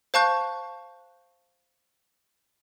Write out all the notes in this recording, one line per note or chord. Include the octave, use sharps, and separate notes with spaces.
C5 F5 A5 C#6 F#6 G6